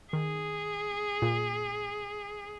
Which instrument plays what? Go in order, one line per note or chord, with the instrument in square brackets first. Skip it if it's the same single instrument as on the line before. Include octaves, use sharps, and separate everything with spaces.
[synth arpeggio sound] D#3 [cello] G#4
[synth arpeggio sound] A#2